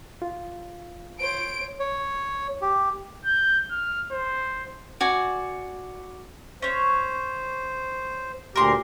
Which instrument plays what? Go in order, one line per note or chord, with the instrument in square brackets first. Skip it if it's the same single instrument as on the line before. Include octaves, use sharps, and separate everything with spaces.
[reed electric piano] F4
[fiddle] C5 C#5 [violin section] D7
[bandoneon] C#5
G4
[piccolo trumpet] G6
F6
C5
[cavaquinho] F#4 D5 G#5
[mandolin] C#4 C#5 [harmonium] C5
[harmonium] D2 A#2 G4 [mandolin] A#4 C6